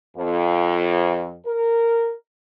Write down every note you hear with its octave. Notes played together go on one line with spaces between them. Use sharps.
F2
A#4